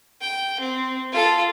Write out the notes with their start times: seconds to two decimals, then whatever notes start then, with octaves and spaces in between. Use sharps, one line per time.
0.21 G5
0.60 C4
1.12 F4 A4